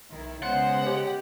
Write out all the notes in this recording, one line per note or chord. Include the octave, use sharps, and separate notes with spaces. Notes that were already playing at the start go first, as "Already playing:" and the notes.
B1 D#3 E4
C#3 G#3 B3 C5 F#5
G4